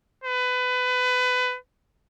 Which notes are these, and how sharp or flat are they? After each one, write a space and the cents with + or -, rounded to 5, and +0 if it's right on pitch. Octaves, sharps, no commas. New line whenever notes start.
B4 +25